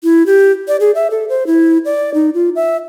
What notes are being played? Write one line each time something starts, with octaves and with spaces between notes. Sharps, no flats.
E4
G4
D5
G#4
E5
A4
C5
E4
D5
D#4
F4
E5